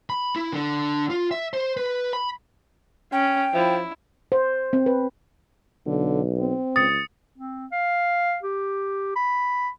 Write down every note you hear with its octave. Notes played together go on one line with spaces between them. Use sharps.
B5
E4
D3
F4
E5
C5
B4
B5
C#4 G5
F3 E4
C5
C4
B4
B1 D3
C4
C#2 D#6 A6 C#7
C4
F5
G4
B5